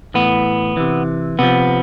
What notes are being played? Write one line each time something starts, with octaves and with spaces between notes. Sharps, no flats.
A2 E3 B3
C3 E3
C3 F3 B3